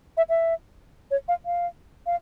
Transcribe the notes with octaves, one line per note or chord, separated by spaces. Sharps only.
E5
E5
C#5
F5
F5
F5